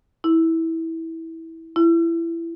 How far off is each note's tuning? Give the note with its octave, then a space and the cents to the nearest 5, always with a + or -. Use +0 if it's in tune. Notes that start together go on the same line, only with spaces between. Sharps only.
E4 -15
E4 +20